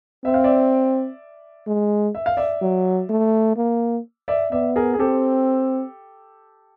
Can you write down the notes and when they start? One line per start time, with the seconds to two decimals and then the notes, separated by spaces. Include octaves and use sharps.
0.25 C4 E5
0.34 F5
0.44 D5 E5
1.67 G#3
2.15 E5
2.26 F5
2.37 D5 E5
2.61 F#3
3.09 A3
3.56 A#3
4.28 D5 E5
4.52 B3 D5 E5
4.76 G#4 A#4
4.94 G#4
4.99 C4 G4 A4